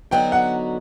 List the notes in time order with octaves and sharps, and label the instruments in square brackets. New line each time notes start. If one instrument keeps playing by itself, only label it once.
[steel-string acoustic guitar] D3 F#3 B3 D#4 F#4 [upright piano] G5
[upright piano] F#5